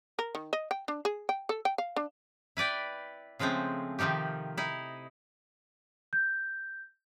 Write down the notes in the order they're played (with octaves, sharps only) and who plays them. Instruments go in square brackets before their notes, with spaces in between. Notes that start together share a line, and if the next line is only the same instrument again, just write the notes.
[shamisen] A#4
D#3
D#5
G5
D4
G#4
G5
A4
G5
F5
D4
[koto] E4 B4 D5 G5
C#3 F3 G#3 A3 C4
C3 D#3 F3 D#4 G4
D#4 E4
[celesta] G6